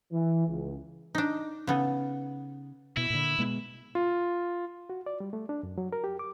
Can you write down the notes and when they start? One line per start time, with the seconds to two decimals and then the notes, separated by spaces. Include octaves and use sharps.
0.13 E3
0.48 C#2
1.15 D4 D#4
1.67 C#3 B3 A4
2.97 B2 E4
3.10 A#2 D3
3.39 B2 G#3 B3
3.95 F4
4.90 F#4
5.06 D5
5.20 G3
5.33 A3
5.49 D4
5.63 F#2
5.78 F#3
5.93 A#4
6.04 G4
6.19 D6